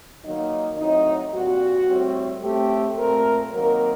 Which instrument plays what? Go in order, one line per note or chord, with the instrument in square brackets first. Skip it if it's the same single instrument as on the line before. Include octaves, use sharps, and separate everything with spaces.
[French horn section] D#3 F#3 A#3 D#4
A2 F#3 C4 D#4
A#2 G3 C4 F#4
A2 G3 C4
A2 A3 C4 G4
A#2 A3 C4 A#4
C3 D#3 F#3 A#3 A#4